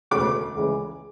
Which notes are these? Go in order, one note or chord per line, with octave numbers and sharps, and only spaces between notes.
E1 D2 C#3 D6
C#2 C#3 E3 G#3